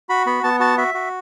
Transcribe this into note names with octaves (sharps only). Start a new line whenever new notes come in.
F#4 B5
B3 B5
B3 A5
F#4 A5
F#4 E5
F#4